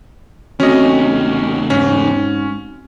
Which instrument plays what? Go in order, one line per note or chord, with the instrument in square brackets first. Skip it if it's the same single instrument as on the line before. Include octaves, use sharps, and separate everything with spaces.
[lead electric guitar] E2 A3 [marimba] C4 F#4 [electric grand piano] C#4 D#5
[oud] G#2 [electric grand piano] C#4